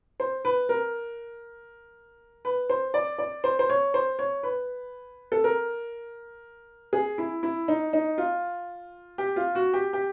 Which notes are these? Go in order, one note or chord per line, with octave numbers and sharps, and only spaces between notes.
C5
B4
A#4
B4
C5
D5
D5
C5
C5
C#5
C5
C#5
B4
A4
A#4
G#4
E4
E4
D#4
D#4
F4
G4
F4
F#4
G4
G4